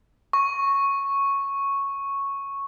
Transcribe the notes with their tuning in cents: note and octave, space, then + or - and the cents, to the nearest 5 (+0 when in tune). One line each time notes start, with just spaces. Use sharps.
C#6 -5